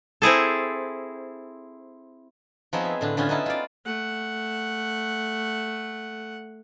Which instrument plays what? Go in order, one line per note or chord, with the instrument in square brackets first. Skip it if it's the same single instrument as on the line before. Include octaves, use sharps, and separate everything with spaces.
[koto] C4 E4 G#4 A4
[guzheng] F3 B3 C4 D#4 G#4 C#5
E5
A2 D3 D4
D3 B3 C#4 F4 G#5
C#4 D#4 E4 A5
F4 D5
[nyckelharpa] A3 F#5